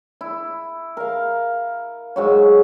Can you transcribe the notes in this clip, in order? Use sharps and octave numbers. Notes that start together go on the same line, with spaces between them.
E4
A#4 F5
G#2 F#3 C#5